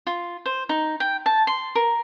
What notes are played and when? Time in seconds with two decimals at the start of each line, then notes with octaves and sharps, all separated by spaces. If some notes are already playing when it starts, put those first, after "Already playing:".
0.07 F4
0.46 C5
0.69 D#4
1.00 G5
1.26 A5
1.47 C6
1.75 A#4